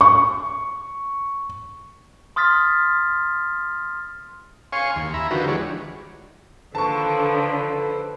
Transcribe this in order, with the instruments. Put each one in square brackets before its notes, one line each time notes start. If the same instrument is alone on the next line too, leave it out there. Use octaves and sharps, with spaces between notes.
[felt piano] C#6
[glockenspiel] C6 D#6 F6 A6 B6
[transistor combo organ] C#5 F5 G#5 C6 C#6
D#2
E5 A#5 B5
D3 D#3 F3 F#4 G4 B4
E3 G#3 D4 C#5
[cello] D3 [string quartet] D#3 F3 [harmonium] A4 B4 C5 [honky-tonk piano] A5 C#6